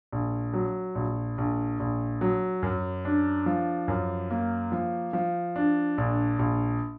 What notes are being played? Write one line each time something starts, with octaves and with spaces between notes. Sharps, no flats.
A#1
F#3
A#1
A#1
A#1
F#3
F#2
D4
F3
F#2
A#3
F3
F3
D4
A#1
A#1